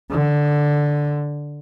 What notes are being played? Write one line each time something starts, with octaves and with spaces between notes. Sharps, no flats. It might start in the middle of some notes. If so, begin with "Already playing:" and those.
D3